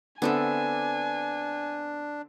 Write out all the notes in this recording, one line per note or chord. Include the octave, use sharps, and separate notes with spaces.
D3 B3 C4 D4 A4 E5 G#5